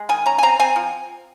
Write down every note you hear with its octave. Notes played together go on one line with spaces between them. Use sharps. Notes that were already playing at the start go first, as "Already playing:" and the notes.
Already playing: G#3
D#3 G#5
C#4 A#5
G#5
C4 A#5
C4 G#5
F3